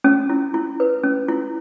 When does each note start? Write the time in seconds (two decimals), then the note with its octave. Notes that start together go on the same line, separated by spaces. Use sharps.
0.04 C#4
0.30 E4
0.54 E4
0.80 B4
1.04 C#4
1.28 E4